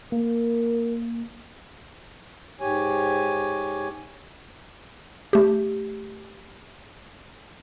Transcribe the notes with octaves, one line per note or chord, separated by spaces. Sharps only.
A#3 A#4
G#2 G4 C#5 G#5
A3 G4